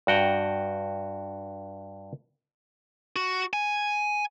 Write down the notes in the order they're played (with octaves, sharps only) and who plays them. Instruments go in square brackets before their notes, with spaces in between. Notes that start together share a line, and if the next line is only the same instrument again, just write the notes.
[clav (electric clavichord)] G2 F#4 G5 A#5
[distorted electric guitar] F#4
G#5